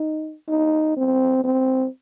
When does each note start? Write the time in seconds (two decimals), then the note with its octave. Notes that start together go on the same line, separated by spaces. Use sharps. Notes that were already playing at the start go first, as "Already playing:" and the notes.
Already playing: D#4
0.49 D#4
0.96 C4
1.44 C4